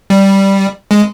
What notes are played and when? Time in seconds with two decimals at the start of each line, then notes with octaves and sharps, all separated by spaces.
0.10 G3
0.91 G#3